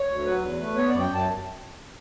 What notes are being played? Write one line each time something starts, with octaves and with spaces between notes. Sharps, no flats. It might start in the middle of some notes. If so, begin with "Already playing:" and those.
Already playing: C#5
D2
F#3 B4
E2
A3
B3 C#5
F#2 D5
G5
F#2 A5